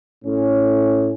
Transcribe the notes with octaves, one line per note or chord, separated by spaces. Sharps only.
A2 C#4